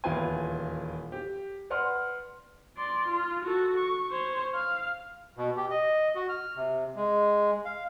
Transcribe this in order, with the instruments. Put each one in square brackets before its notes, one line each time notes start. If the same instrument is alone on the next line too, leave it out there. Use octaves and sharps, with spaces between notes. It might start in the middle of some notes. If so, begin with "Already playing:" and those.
[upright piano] D#1 E2 E4 F4 B4 G#5
G4
B4 D5 F#5 C6 F6
[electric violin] D5 C6
F4
F#4 A4
C#6
C5 C#5
F5
[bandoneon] B2
G4
D#5
F#4
F6
C3
G#3
F5